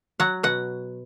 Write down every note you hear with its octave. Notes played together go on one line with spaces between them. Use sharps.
F#3 F#5
B2 F#5